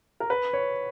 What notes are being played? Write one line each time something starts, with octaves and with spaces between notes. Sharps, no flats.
A#4
B4
C#5